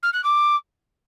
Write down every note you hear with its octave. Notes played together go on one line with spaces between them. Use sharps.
F6
F#6
D6